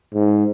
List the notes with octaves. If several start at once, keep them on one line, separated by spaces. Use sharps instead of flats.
G#2